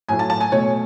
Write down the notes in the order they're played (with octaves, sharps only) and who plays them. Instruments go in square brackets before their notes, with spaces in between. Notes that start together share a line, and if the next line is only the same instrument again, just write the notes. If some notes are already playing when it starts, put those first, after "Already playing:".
[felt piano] A2 F#3 A3 G#5
A5
A5
G#5
B2 A3 C#5